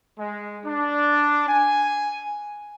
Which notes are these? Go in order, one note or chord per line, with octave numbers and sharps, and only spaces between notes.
G#3
D4
G#5